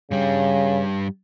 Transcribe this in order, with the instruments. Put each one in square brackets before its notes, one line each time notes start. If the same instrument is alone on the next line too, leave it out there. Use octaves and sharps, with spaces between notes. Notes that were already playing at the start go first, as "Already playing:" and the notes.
[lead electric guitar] G2 G3 [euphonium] C#3